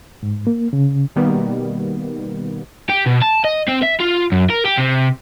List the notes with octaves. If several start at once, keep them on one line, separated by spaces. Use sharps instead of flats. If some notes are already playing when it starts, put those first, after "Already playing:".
G#2
A#3
C#3
B2 D#3 G3 A#3 B3
G4
B2
A5
D#5
C4
E5
F4
F#2
A#4
G4
C3